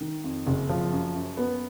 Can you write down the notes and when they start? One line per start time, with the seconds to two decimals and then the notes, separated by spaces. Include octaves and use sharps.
0.01 D#3
0.24 F2
0.47 F#1
0.69 F3
0.92 F#2
1.14 F#2
1.37 B3